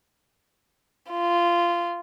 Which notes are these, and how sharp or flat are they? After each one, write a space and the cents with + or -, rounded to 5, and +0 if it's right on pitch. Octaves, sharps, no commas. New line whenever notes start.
F4 -15